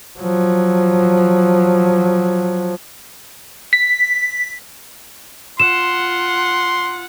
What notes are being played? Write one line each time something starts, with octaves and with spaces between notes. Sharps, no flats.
F3 F#3
B6
F4 F#5 C6 E7